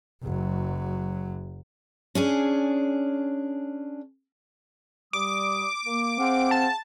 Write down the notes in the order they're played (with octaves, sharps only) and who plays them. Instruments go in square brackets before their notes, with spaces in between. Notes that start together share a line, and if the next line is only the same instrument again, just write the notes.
[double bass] F#1 F#3
[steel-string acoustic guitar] C#4 D4 G#4
[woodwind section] G3 D#6 [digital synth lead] D6
[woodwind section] A#3
[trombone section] C4 [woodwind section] G#4 F5 F#5
[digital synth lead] A5